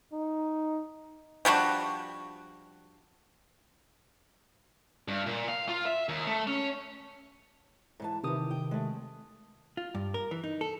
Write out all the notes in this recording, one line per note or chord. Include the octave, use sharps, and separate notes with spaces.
D#4
F3 G3 D4 F#4
G2
A#2
F5
F4
E5
D#2
A3
C#4
G#2 E3 A5
C3 D#3 E3 G4 D#6
G5
G#3 A3
F4
G2
A#4
E3
D#4
A4